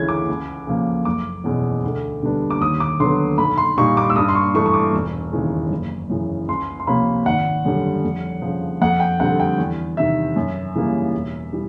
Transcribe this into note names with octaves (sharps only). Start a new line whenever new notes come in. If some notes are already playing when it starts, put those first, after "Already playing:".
Already playing: D2 C#3 E3 G#3 C#4 G#6
D6
C#2
C#3 F3 A#3
F#1 D6
E2 B2 G#3 C#4
D2
D3 G3 B3 D4
D6
D#2 D#6
D6
D3 F#3 B3 C6
B1 B5
C6
A#2 G3 A#3 D#4 C#6
D6
E6
G2 D#6
C6
C#6
E3 A3 D4 C#6
C#6
D6
E1
D#2 C#3 E3 G#3
F#1
F#2 C#3 E3
C#2 C6
C6
C3 F3 A#3 C#4 B5
G#1 F#5
F#2 D3 G3
F2
C#3 F3
F2 F#5
G5
D3 G3 C4 F#5
G5
E2
C3 D#3 E5
F#2
C#3 E3 G3 A#3
E1
E3 G3